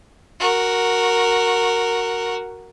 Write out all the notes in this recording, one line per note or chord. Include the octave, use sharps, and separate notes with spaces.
F#4 A#4